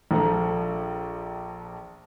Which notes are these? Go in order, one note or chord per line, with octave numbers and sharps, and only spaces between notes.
A#1 F3 A4 A#5